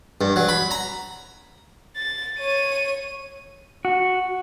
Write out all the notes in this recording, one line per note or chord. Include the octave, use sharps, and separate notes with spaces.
G2
F#3
B5
A#5
A6
C#5 D#7
F#4